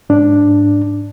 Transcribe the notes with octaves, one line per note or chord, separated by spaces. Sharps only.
G#2 D4